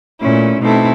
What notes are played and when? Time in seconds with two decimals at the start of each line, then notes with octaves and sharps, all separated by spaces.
0.21 A#2 A3 C#4 E4
0.60 B2 A3 C4 D#4 E4 A4